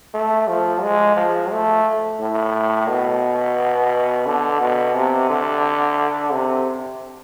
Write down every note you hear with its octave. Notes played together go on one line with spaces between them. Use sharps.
A3
F3
G#3
F3
A3
A2
B2
D3
B2
C3
D3
C3